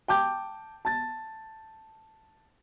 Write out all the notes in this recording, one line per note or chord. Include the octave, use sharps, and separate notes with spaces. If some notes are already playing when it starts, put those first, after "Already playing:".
G5 A5 D6 G6
A5 A6